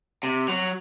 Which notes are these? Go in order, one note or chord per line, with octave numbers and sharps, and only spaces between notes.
C3
F#3